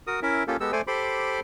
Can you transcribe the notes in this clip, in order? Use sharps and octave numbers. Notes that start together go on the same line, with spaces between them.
F#4 A#4 D#6
C#4 E4 A#4 E5
A#3 C#4 F4 G4 A4
G#3 B3 G4 A4 E6
A3 A4 C5 D5 G#5
G4 A4 C5 B5 C6 D6